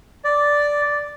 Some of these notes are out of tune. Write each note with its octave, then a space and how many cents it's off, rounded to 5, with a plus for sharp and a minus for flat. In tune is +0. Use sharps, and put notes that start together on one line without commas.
D5 -5